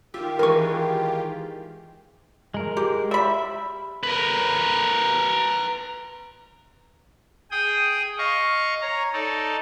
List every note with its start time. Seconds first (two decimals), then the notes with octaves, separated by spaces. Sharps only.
0.14 D#3 F4 G4 E5
0.39 E3 G#3 A#4 C#6
2.54 G#3 A#4
2.77 G4
3.11 G3 E5 B5
4.03 A#4 B4
7.51 G#4 G5 D#6
8.18 D#5 F5 C#6
8.81 C#5 A#5
9.13 D#4 A4 D5